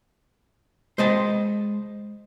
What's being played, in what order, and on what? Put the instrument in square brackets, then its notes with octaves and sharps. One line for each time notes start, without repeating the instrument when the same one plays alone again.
[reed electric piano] G#3 [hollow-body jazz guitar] C5 D#5 A5